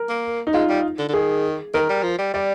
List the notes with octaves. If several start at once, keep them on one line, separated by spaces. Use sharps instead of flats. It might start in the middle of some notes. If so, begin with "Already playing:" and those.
Already playing: A#4
A#3
D#4
G#3 F4
G3
D3
D3
D#3 G#4
D#3 A#4
G3
F3
G3
G3 D5